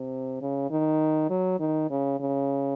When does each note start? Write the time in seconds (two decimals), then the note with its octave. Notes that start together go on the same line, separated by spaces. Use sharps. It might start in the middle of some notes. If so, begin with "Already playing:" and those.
Already playing: C3
0.41 C#3
0.71 D#3
1.30 F#3
1.60 D#3
1.91 C#3
2.20 C#3